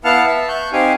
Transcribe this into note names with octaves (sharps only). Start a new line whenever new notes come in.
B3 E4 F5 F#5 A5 F6
E5 A5
C#6 F#6 G6
C4 D#4 G4 F5 G#5